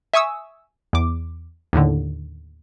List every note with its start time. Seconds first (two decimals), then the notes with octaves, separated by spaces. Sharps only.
0.13 E5 G#5 C#6 D#6 E6
0.93 E2 D6
1.73 D#2 A2 D3